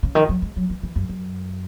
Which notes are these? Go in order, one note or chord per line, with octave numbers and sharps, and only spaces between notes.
C#3
D#3
F#3
G#3
F#3
E3
E3
F#2
F#2